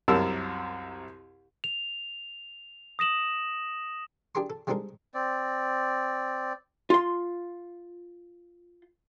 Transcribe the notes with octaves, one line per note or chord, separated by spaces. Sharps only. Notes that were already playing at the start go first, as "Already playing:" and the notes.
C2 F#2 C3 A#4 A5 E6
F7
D#6 A#6 E7 F#7
D4 G4 G#4 A#4 A#5 C6
A4
G3 G#3 C4 D#4 A4 A#4
C4 D5
F4 C6